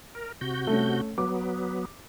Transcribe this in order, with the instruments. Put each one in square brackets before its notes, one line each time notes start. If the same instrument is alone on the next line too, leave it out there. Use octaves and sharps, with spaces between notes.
[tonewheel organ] A#4
C3 F#4 G6
[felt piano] A3 C#4
[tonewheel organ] F#3 B3 [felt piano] D6